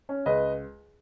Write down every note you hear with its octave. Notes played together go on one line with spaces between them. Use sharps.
C#4
C#2 B4 D#5